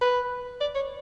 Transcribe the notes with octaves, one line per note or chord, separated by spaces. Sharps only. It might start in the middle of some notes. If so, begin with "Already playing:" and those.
B4
D5
C#5